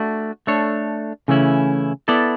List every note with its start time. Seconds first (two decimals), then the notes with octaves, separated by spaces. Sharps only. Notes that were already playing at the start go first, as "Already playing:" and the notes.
Already playing: A3 D4 F#4
0.47 A3 D4 A4 C#5
1.28 C#3 E3 A3 C#4 E4
2.08 B3 E4 A4 D5